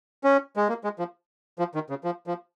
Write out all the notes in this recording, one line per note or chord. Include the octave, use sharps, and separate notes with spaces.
C#4
G#3
A#3
G#3
F3
F3
D#3
C#3
F3
F3